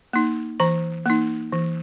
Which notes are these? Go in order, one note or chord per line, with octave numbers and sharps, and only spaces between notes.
A#3 D#4
E3 A#5
A#3 D#4
E3